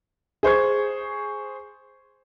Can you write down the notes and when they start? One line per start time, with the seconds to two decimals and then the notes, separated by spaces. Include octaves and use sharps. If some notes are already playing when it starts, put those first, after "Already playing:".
0.43 G#4 C5 C#6 G#6